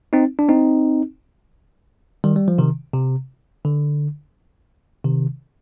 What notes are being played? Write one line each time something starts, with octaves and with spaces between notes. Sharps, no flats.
C4 D#4
D4
C4 D#4
D#3 G3
G3
F3
C3 D#3
C3
D3
C3 D#3